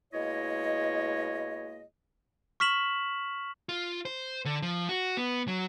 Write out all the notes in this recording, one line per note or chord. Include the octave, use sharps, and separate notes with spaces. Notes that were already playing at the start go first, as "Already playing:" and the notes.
B2 G#3 A#3 E4 C#5 D#5
C#6 F6 B6 E7 F#7
F4
C5
D3
F3
F#4
B3
F#3